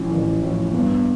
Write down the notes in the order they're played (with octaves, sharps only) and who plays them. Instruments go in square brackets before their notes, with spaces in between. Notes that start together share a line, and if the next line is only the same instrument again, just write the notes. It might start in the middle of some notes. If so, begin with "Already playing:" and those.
Already playing: [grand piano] A1 A2 F3 [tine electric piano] C#4
[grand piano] A1
A2 F3
[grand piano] G2 [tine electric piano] B3